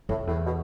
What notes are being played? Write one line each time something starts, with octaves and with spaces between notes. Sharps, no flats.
F2 A2
E2 A2
B2